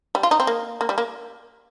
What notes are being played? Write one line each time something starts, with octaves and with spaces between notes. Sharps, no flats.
G3
F4
D#4
C4
A#3
A#3
G3
A#3